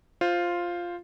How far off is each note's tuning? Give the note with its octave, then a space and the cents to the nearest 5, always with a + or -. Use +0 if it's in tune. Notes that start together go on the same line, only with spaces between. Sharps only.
F4 +0 C5 +5